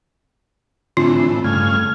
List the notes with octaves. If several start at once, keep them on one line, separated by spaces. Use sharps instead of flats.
A2 D3 E3 C4 D4 F4
G2 C#3 A3 F6 G#6